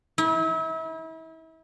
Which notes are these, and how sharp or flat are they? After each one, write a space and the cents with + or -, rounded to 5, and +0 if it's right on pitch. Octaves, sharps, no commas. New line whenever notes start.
E4 -35